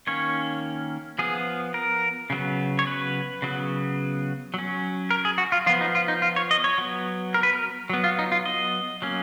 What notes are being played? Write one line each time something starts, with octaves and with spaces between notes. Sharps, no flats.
D#3 A#3 C#4 C#5
F3 B3 G#4
A#4
C#3 F#3 B3
C#5
B4
C#3 F#3 B3
F#3 C#4
A#4
G#4
F#4
F4
F3 B3 F4
D#4
F4
D#4
F4
C#5
D#5
C#5
F#3 B3
A#4
B4
A#4
F#3 B3
F4
D#4
F4
D#5
F#3 A#3 C#4